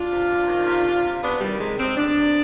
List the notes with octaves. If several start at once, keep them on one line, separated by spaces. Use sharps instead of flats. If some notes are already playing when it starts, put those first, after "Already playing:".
Already playing: D4 F4
C3
C3
D#3
C3
C3
C3
C3 B3 D4
D#3 G3
C3 G#3
C3 G#3 C4
C3 B3 D4
C3